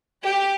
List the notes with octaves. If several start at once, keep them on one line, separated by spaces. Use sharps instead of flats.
G4